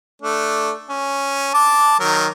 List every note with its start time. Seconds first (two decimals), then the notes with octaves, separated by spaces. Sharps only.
0.22 A3 D4
0.89 C#4
1.54 A5 D6
2.00 D#3 F#3 A#4